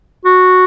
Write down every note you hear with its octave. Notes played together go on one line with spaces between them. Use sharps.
F#4